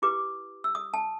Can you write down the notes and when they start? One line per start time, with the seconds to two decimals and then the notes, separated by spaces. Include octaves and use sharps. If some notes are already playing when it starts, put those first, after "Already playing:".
0.02 E4 G4 B4 D6
0.64 E6
0.75 D#6
0.94 A5